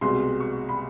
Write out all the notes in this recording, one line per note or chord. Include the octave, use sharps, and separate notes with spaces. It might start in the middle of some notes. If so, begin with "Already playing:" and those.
C2 B2 G#3 C6
C#6
B5